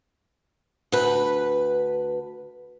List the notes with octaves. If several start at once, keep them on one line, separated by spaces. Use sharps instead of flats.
D2 B4